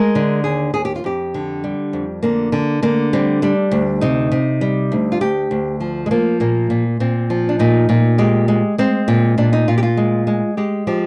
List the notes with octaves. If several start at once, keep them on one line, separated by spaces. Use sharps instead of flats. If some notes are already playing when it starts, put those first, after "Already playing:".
Already playing: G#3 A#4
D3
D#2 G#4
D#2 G#4
G4
F4
F2 G4
D3
G3
F2
D3 A#3
D3
D3 A#3
G3 C4
G3 D4
D2
C3 D#4
C3
G3
D2
F4
D2 G4
D2
F3
G#3
F3 A#3
A#2 A#3
A#2
A#2 C4
F3
D4
A#2 D#4
A#2
G#3 G4
G#3
G#3 C4
A#2
A#2 D4
D#4
A#2 F4
G4
F4
G#3
G#3
G#3 G4
F3 G4